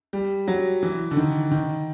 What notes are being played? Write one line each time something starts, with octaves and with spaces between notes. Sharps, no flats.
G3
F#3
E3
D3
D#3
D#3